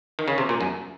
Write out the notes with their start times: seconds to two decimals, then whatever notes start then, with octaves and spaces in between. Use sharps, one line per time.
0.19 D#3
0.28 C#3
0.38 C3
0.49 A#2
0.61 F#2